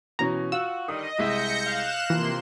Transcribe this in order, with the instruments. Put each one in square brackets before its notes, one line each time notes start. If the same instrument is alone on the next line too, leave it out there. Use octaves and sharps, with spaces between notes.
[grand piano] B2 E3 C#4 [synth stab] A#5
[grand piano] F4 [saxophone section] F#4 [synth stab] E6
[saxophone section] D3 D#3 G3 [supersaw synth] D#5 [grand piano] D#6
[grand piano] C2 G#3 D#5 [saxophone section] E5 [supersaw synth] G6 A#6 C#7
[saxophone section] F5 [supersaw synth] F#6 E7
[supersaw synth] C3 A#3 C6 [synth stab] E3 [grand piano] F3